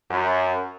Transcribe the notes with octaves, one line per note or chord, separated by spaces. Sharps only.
F#2